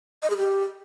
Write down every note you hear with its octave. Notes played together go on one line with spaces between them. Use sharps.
D#5
G#4
G4